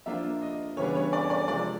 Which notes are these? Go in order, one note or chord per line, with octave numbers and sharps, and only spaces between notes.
F3 A#3 D4 F4 E5
D#5
C#3 E3 G3 B3 D4 C#5
C#5
D5
D5
C3 F3 G#3 D5